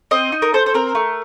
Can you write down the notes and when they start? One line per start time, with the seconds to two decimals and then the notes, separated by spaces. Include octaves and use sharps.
0.11 C4 D#5
0.32 D#4
0.42 A#4
0.54 A4 C5
0.66 C5
0.74 C4 A#4
0.95 A3